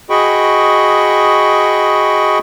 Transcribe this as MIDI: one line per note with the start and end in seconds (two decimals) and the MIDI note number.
0.10 2.39 66
0.10 2.39 68
0.10 2.39 75
0.10 2.39 79
0.10 2.39 83
0.10 2.39 85